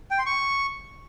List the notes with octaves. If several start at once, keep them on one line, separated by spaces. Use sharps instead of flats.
G5
C6
C#6